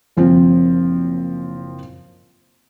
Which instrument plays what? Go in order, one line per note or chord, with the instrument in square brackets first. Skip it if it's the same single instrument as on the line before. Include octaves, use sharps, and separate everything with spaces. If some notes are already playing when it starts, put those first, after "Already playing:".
[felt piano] F#1 F3 C4